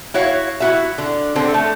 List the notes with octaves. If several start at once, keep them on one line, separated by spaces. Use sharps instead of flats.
E4 F#4 C#5 F5
E4 F#4 E5
D3
D3 C4 A4
A3